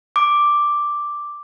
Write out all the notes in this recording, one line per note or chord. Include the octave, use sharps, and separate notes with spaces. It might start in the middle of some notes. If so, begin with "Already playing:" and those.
D6